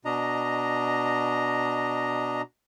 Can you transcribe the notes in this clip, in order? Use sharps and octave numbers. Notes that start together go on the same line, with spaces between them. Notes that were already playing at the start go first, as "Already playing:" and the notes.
B2 D4 D#5 A#5